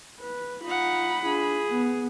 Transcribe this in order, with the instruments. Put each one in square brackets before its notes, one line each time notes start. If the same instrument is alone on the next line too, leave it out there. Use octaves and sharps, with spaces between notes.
[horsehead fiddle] B4
[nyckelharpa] D#4 F#5 [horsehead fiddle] F4 [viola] B5
[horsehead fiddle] D4 F4 [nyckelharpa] G#4
[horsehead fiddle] B3